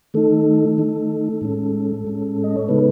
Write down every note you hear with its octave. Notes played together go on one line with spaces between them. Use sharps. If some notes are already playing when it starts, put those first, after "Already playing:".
D#3 A3 D#4 A4
D#3 A3 D#4
A2 G#3 C#4
A2 G#3 C#4
D#5
C#5
C#3 G#3 B3 D#4 B4